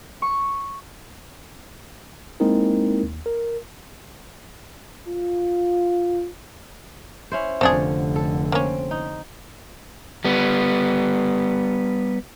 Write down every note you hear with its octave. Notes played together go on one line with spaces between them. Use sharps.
C#6
G#3 A#3 C4 D#4 E4 A#4
D#2
A#4
F4
C#4 E4 C5
F1 D3 F3 C4 D4 G#4 C#5
A4
A#3 C4 C#4
D#4
G3 B3